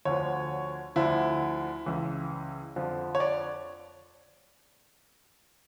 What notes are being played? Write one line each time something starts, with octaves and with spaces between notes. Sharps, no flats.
D2 D3 F3 C#5
D2 D3 F3 E4
C#2 C#3 E3
F2 D3 F3
C#5
D5